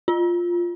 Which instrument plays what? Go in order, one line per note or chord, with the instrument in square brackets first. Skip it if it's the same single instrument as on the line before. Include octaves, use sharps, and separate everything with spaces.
[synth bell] F4